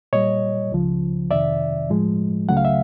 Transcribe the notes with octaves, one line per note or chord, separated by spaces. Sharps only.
A#2 G3 C#5 D#5
C#2 C#3 F3
F2 C3 D#3 D5 E5
A2 F3 G#3
C#2 C#3 F#3 A3 F#5
F5
E5